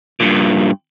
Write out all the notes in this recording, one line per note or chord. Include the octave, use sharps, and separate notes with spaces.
G2 A#2